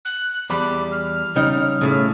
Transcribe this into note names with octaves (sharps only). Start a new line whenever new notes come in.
F#6
E2 G3 B5 D6
F6
C#3 G3 D#4
A2 C#3